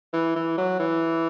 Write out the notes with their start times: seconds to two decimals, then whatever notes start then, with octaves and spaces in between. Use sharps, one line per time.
0.13 E3
0.36 E3
0.57 F#3
0.79 E3